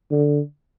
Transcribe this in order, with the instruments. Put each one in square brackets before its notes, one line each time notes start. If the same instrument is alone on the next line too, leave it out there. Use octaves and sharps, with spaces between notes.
[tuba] D3